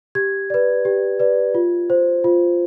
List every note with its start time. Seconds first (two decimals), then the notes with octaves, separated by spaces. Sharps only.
0.15 G4 G#6
0.50 B4 D5
0.85 G4
1.20 B4 D5
1.55 F4
1.90 C5
2.24 F4